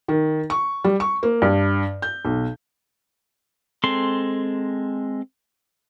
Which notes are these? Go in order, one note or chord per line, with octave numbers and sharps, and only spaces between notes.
D#3
C#6
G3
C#6
A#3
G2
G6
B1
G#3 C4 A4 C6